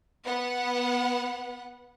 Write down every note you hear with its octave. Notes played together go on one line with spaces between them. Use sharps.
B3 F#5